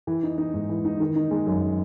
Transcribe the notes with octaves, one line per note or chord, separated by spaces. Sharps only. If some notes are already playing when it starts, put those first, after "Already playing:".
E3
D#4
D#4
G#2
E3
D#4
D#3
D#4
G#3
F#2